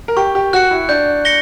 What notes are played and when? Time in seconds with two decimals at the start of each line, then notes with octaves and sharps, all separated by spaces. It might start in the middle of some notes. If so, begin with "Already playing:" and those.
0.08 A#4
0.17 G4 C#6
0.35 G4
0.53 F#4 F#6 C#7
0.71 E4
0.89 D4 G6
1.25 A#6 C#7 G7